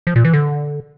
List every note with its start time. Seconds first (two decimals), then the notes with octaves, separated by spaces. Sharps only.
0.07 F3
0.16 A#2
0.25 E3
0.33 D3